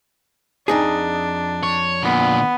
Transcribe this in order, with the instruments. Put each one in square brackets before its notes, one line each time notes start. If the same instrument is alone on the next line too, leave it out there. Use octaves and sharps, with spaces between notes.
[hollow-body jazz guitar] F2 D#4 G#4 [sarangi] D4
[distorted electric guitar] C#5
[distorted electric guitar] A#2 D3 [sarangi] B3